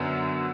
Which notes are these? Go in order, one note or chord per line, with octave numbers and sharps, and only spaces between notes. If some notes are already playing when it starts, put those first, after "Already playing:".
Already playing: F#2 D3 F#3 B3